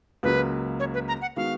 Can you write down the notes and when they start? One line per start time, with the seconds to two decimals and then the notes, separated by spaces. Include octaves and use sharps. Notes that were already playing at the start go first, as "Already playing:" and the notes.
0.23 C#2 C#3 F#3 A#3 B4
0.80 C#5
0.94 B4
1.08 A#5
1.22 F#5
1.36 D#3 G#3 B3 F#4 F5